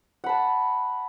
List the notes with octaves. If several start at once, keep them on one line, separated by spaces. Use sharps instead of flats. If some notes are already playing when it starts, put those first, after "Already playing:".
F#5 A5 B5